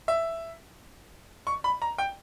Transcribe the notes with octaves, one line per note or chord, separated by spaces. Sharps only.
E5
C#6
B5
A#5
G5